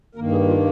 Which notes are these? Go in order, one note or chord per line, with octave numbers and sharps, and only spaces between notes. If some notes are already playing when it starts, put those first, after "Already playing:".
G2 D#3 A#3 A#4
G#4
F4